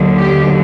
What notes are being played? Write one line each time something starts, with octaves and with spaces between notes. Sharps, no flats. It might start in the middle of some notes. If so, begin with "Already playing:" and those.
Already playing: D#2 D3 F#3
G4